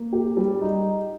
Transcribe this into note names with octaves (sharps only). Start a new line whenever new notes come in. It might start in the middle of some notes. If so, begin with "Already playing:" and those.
Already playing: A#3
G4
G3
D#4